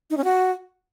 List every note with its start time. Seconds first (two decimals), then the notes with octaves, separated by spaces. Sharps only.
0.10 D#4
0.17 C#4
0.24 F#4